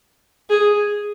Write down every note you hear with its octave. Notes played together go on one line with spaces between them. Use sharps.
G#4